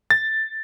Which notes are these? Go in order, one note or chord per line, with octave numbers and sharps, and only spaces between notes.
A6